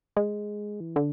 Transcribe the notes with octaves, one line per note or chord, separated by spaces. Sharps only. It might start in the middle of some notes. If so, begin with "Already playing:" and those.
G#3
E3
D3